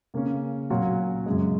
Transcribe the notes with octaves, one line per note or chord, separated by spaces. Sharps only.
C#3 A#3 C#4
A#2 F#3 C#4 F#4
F#2 C#3 G#3